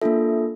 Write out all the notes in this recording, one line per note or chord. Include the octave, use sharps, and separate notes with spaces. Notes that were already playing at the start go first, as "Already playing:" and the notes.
A#3 D4 F4 A4 E5